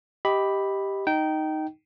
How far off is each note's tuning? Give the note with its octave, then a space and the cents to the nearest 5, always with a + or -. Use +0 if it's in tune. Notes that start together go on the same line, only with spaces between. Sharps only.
G4 +0 D#5 +15 B5 +0
D#4 +0 G5 -20